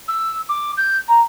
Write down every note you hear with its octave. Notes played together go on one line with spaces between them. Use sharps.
E6
D6
G6
A#5